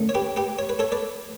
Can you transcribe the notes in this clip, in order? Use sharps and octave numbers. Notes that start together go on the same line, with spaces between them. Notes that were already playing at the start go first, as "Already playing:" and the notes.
Already playing: F#2 D3 A3
C#5
G4 B4
G4 B4
C#5
B4
A4 C#5
B4 D5